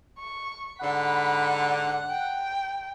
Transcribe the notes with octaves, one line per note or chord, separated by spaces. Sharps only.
C#6
G#2 D3 F#5 B5
G5